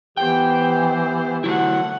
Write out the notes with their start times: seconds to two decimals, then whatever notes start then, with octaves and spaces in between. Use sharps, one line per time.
0.17 E3 B3 G4 C5 G5
1.44 F#3 A3 E4 F#5